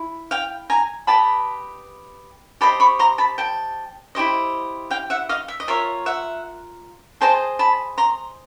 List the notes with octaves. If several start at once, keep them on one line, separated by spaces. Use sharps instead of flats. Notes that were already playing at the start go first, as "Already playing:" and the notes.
Already playing: E4
F5 G5
G#5 A#5
G4 B4 D#5 A5 B5
G4 C5 D#5 A5 B5
B5 C#6
A#5 C6
A5 B5
G5 A5
E4 G4 C5 D#5
F5 G5
E5 F#5
D#5 F5
E5
D#5
F4 A#4 C#5 E5
E5 F#5
G#4 C5 D#5 G5 A5
A5 B5
A#5 C6